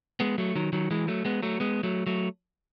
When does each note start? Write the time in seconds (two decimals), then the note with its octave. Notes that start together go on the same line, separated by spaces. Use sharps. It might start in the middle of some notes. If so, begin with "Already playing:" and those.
0.20 G#3 B3
0.38 F#3 A3
0.55 D#3 F#3
0.73 D#3 F#3
0.91 E3 G#3
1.08 F#3 A3
1.25 G#3 B3
1.43 F#3 A3
1.60 G#3 B3
1.83 F#3 A3
2.06 F#3 A3